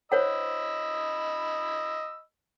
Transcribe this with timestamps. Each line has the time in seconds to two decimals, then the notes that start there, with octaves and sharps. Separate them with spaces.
0.12 C5 C#5 D#5 F#5 B5 E6